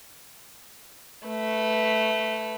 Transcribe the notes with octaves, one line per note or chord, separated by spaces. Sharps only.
A3 B4